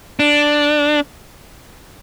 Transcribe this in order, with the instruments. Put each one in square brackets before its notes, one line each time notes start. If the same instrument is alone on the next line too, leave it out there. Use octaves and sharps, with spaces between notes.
[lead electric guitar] D4